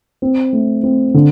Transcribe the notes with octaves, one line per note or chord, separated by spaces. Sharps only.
C4
A3
C4
D3